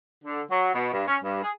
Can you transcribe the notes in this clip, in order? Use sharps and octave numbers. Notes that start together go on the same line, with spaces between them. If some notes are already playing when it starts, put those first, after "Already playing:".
D3
F#3
B2
G2
C#4
G2
G#4